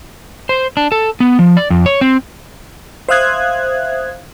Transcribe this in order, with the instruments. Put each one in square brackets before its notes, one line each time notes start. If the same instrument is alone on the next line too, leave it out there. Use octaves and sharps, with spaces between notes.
[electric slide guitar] C5
D4
A4
B3
F3
D5
F2
C#5
C4
[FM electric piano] C5 E5 F5 D#6 F#6 G#6